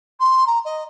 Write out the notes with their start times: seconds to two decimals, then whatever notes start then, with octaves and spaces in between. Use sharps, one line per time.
0.20 C6
0.47 A#5
0.65 D#5